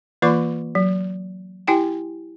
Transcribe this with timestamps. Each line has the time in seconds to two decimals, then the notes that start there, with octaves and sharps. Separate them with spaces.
0.22 E3 A#3 F4 D5 C#6 D6
0.75 F#3
1.67 E4 G4 G5 G#5